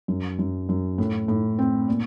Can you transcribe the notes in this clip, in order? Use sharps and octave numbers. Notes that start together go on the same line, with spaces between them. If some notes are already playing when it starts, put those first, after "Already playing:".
F#2
F#2
F#2
A2
A2
C4
A#2